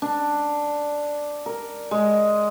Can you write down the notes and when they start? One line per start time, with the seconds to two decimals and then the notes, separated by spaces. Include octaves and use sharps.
0.02 D4
1.46 A#4
1.91 G#3